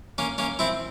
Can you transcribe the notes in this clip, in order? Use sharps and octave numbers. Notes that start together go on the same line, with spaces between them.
A#3 C#4
A#3 C#4
C4 E4